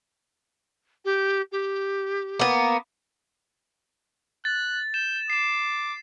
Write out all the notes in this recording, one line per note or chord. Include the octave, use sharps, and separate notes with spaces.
G4
G4
A#3 B3
F#6 A6
G6 E7
D6 C7 E7